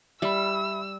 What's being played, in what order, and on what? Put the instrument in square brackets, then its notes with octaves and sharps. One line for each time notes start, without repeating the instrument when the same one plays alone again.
[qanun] G3 [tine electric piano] E5 B5 [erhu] E6